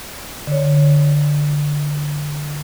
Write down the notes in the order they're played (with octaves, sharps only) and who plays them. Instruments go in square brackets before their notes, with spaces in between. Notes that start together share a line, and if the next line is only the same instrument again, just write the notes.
[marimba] D3 C#5